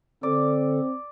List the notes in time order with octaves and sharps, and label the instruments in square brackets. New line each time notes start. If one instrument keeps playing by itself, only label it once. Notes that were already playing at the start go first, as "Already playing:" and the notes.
[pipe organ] D3 A4 [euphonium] C4 [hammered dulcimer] D5